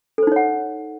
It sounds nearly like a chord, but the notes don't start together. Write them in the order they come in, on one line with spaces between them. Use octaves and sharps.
A4 C5 D#4 C#5 F#5